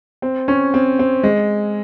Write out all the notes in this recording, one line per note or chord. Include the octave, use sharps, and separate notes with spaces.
C4
C#4
C4
C4
G#3